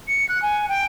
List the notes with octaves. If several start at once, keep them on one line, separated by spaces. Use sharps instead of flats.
C#7
F#6
G#5
G5